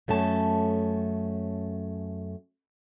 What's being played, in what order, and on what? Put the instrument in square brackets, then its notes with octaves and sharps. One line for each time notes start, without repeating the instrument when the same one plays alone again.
[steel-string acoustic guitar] F#2 A3 C#4 A5